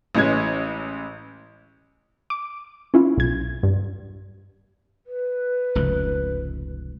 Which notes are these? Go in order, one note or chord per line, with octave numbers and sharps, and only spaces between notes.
A1 E3 G#3 C#4 G#6
D6
C#4 E4 F4
B1 G#6
G2
B4
F1 C#2 G#2